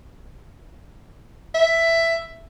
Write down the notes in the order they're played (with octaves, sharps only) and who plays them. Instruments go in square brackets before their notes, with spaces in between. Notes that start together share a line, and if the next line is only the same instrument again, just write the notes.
[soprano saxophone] E5